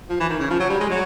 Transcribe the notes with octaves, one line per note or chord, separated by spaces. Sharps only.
F3
E3
D#3
C#3
F3
F#3
G3
G#3
F#3